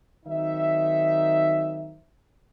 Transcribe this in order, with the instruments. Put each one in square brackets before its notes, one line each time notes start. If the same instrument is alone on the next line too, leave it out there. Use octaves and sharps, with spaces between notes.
[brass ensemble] D#3 F#3 C4 D#4 E5